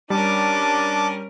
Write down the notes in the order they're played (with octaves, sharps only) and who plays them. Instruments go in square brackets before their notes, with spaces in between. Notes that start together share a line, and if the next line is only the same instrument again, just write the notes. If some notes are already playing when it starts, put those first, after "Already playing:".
[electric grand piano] G3 [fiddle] C#4 A#4 [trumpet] D4 [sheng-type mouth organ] A5 D6